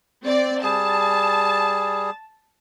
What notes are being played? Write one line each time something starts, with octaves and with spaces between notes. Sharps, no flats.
C4 D5
G3 G#4 A5